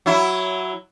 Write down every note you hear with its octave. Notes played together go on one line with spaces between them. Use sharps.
F#3 E4